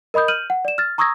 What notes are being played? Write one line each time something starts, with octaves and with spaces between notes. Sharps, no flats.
A#4 D#5 B5 D#6 G6
F6 G6 D#7 F#7
F#5
D5 E7
F6 A6
A#5 C#6 D#6 E6 G#6 A#6